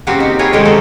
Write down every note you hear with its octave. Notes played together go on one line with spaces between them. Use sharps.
C#3 F#3 A#3 C4 F#4 G4
D#4
E4 F4 G4 G#4 C#5 D#5
C3 D#3 G#3 A3 G4 A#4
G#3 C4 F#4 A4